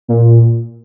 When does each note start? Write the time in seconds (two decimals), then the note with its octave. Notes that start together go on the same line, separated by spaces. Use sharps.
0.08 A#2